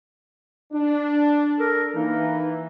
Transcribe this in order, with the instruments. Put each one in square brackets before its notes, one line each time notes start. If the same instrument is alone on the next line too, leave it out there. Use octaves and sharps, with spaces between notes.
[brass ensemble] D4
[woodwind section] A4 A#4
[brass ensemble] E3 [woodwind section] A#3 D#4